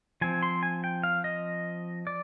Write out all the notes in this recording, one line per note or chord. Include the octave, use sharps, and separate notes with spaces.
F3 C4 G#5
C6
G#5
G5
F5
D#5
D5